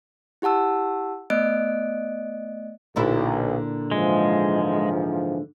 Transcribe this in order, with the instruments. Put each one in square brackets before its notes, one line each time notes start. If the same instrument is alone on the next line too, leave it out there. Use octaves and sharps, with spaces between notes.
[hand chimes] E4 G4 F#5 A5 E6
A3 B3 D5 D#5 F#6 D7
[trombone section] B1 [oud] A#2 D3 E4
[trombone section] G#2 E3 F3 [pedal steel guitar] G#3